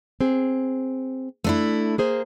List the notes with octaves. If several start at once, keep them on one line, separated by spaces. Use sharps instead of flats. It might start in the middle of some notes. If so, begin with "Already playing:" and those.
C4 G#4
A3 D4 E4
A#3 G#4 C5